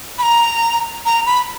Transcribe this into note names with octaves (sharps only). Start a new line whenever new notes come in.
B5
A#5
A#5
B5